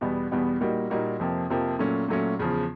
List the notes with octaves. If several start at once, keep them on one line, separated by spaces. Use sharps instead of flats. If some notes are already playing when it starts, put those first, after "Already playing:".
E2 B2 G3 B3
E2 B2 G3 B3
A#2 G3 A#3 D#4 F#4
A#2 G3 A#3 D#4 F#4
F2 C3 F3 A#3
F2 C3 F3 A#3
A#2 F#3 A3 C#4
A#2 F#3 A3 C#4
E2 C#3 F3